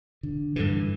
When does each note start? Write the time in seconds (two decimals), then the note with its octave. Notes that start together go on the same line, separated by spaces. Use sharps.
0.23 D3
0.56 G2 D3 E3